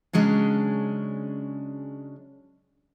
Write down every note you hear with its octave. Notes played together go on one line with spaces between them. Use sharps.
C#3 F#3 G#3 C#4 D4